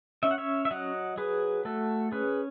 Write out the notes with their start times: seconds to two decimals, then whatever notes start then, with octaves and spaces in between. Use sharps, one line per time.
0.23 C#4 E5
0.31 F#5
0.38 C#5 E5
0.65 E5
0.71 F#3 D#5 F#5
1.18 F#3 G#4 B4
1.65 A3 F#4 A4
2.12 C#4 G#4 B4